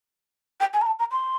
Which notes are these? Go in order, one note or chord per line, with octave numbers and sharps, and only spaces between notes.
G5
G#5
A#5
A5
A#5
C6